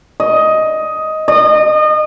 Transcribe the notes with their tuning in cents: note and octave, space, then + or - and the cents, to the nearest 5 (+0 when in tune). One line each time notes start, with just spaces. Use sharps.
D#5 +10
D#5 -30